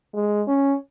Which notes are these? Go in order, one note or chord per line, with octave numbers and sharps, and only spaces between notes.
G#3
C#4